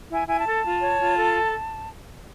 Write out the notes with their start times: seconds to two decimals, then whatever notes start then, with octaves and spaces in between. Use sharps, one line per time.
0.08 E4
0.14 G#5
0.26 E4 G#5
0.39 A5
0.45 A4
0.63 F4
0.80 C#5
0.99 F4
1.17 A4